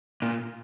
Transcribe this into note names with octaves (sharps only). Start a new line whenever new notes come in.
A#2